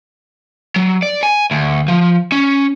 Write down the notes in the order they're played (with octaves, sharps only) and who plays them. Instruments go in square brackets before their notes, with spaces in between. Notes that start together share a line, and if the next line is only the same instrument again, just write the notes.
[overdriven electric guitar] F#3
D5
G#5
D2
F3
C#4